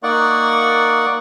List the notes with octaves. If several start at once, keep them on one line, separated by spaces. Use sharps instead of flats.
A#3 D#4 D5 F#5 C#6